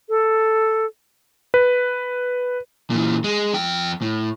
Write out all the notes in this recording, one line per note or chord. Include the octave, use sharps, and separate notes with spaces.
A4
B4
A#2 E3
G#3
F2 G5
A2